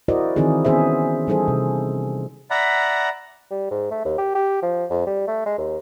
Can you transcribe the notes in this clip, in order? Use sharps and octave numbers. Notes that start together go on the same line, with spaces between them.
E4 F#4 A#4 C5 D5 D#5
D#3 E3 C4 D#4 E4 G#4
D#3 B3 C#4 G#4 C5 E5
E3 G3 D#4 G#4 A4 C5
C3
D5 E5 F#5 A#5 B5
G3
G#2
A3
D#2
G4
G4
F3
F2
G3
A3
G#3
D#2